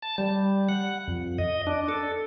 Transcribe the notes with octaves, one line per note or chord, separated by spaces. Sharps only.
A5
G3
F#5
F2
D#5
D4
A4